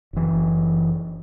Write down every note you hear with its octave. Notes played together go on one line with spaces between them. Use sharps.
F#1 E3